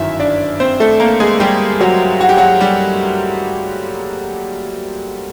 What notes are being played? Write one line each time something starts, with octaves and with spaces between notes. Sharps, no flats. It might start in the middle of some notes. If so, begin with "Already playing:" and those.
Already playing: G1 F#2 D#3 E4 E5
D4 D5
C4 C5
A3 A4
A#3 A#4
G#3 G#4
G3 G4
F#3 F#4
F#4
G4
F#3 F#4
G3 G4